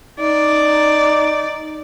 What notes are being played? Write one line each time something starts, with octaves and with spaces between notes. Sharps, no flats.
D#4 D5